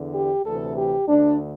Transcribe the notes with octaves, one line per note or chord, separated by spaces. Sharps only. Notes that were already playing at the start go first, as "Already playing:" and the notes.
Already playing: E2 D3
G4
D2 C3 E3 A4
G4
D2 D3 D4